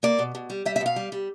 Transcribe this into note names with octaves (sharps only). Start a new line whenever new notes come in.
A#3 D5
B2
B2
G3
G3 E5
E5
B2 F5
G3
G3